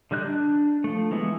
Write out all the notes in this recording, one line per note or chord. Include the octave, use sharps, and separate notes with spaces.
D3 G3 D#4 F#6
D4
F3 A3
E3 G#3 B3 E4